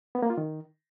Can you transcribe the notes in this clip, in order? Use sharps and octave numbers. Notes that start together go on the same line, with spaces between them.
B3
A#3
F4
D#3